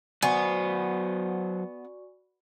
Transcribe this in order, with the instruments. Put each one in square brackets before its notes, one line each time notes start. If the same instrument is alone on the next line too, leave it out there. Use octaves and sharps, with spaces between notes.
[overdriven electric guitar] F#3 C5 [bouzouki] B3 [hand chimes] F#4 D5 C#6 [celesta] G#5